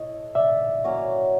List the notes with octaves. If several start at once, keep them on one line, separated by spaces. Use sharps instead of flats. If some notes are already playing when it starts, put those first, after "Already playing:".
Already playing: E4 A4 C#5 D#5
D5 E5
F#3 A#3 C#4 F#4